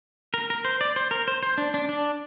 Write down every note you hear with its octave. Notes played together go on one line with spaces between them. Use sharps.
A#4
A#4
C5
D5
C5
A#4
C5
C5
D4
D4
D4